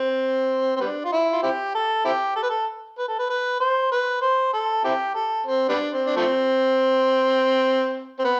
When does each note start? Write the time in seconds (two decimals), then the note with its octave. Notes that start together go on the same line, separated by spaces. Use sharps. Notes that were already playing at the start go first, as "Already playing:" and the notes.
Already playing: C4
0.76 C4
0.80 G3 B3 D4
1.05 F4
1.12 E4
1.32 F4
1.43 C4 E4 G4
1.75 A4
2.05 C4 E4 G4
2.36 A4
2.42 B4
2.50 A4
2.98 B4
3.08 A4
3.19 B4
3.30 B4
3.60 C5
3.92 B4
4.22 C5
4.53 A4
4.84 C4 E4 G4
5.15 A4
5.46 C4
5.69 G3 B3 D4
5.93 C4
6.06 D4
6.17 F3 A3 C4
8.19 C4
8.25 B3